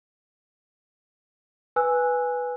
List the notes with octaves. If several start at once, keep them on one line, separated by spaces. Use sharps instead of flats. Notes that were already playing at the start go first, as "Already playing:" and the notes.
B4 G#5 E6 F#6